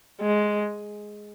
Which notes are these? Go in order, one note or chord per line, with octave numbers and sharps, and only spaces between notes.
G#3